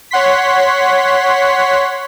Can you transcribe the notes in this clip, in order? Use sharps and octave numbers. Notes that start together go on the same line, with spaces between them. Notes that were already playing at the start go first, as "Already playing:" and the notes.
C#5 F#5 C6 B6